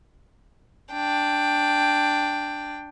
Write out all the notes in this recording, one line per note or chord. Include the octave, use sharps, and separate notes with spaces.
D4 G5